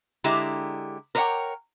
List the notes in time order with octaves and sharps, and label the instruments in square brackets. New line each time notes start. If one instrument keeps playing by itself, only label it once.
[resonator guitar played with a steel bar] D3 G#3 E4 G4 A#5
A#4 B4 C#5 D5 F#5 G5